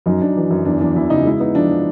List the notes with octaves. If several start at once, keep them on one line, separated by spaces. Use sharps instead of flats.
F#2 D#4
F#2 D4
E3
F#2
E2 D4
E2 D4
E2 E4
C#3 D#4
G#3 E4
B3 D#4
F3 D4
F3